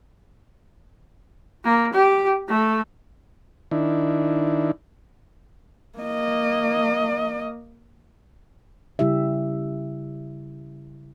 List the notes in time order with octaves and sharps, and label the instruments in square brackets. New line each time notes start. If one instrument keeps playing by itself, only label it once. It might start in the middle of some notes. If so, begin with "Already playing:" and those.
[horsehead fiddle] A#3
G4
A3
[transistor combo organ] D#3 D4 E4
[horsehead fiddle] A#3 D#5
[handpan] C#3 G3 E4 G4 E5